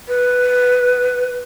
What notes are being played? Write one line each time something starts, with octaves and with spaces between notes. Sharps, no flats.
B4